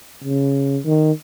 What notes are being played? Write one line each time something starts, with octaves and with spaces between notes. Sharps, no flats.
C#3
D#3